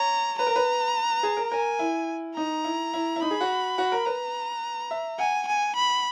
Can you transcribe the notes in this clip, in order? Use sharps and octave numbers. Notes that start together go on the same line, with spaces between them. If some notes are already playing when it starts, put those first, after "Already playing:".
Already playing: C#5 A#5
B4 A#5
A#4
B4
G#4
A#4
A#4 G#5
E4
D#4 A#5
E4
E4
E4
D#4 B5
G#4
F#4
F#4
A#4
B4 A#5
E5
F#5 G#5
G#5
B5